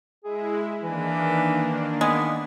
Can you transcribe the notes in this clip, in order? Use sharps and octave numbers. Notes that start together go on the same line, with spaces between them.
G#3 E4 G#4
D#3 E3 A#3 D4
G#3 B3